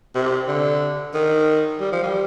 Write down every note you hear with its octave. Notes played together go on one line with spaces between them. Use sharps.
C3
D3
D#3
G3
F3
G3